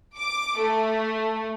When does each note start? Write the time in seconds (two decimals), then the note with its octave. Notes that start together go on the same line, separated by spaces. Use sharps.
0.17 D6
0.59 A3